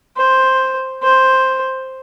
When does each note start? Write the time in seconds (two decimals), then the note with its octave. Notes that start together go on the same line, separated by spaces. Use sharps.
0.17 C5
1.03 C5